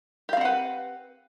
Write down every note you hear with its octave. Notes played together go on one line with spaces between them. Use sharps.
C4 G4 B4 F5 F#5